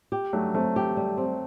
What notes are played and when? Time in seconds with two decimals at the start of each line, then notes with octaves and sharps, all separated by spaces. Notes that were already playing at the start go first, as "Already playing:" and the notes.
0.12 G4
0.33 F#3 G3 A3
0.54 F#3 A3 C4
0.76 G4
0.97 G3
1.17 C4